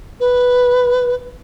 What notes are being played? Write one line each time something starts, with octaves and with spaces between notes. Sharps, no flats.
B4